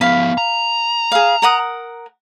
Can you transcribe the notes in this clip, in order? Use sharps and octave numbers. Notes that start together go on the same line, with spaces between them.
F3 B3 F5 B5
A#5
G#4 F5
A#4 F#5 D#6